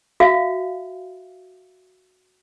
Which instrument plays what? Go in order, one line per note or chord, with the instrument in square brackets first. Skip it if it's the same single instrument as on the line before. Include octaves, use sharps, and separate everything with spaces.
[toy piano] F#4 E5 F5